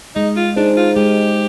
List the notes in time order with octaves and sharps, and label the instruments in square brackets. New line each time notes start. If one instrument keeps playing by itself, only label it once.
[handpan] G#3 [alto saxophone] D#4
[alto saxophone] F4
[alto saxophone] D4 [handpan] D#4 G#4 C5
[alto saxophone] F4
[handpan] G#3 [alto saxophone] G4